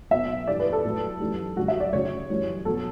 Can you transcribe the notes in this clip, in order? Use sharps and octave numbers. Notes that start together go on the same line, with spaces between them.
B2 F#3 E5
G2 E3 G3 D5
B4
A4
A2 F#3
F#2 E3 G3
F#2 D3 G3 F#4
E5
D5
F#2 C#3 F#3 C#5
F#2 E3 G3
B2 F#3 A4